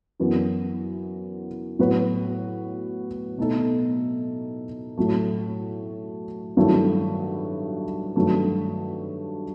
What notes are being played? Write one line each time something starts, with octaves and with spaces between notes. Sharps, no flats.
F#2 E3 B3 F#4
A2 F#3 B3 F#4 B4
B2 A3 D#4 A4
A2 F#3 A3
G2 D#3 F#3 A3 E4
G2 D#3 F#3 A3